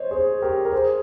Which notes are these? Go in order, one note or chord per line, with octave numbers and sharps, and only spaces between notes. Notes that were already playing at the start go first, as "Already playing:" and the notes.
Already playing: C5 C#5 D#5
G#4 C5
G4 A#4
A#4
G#4 C5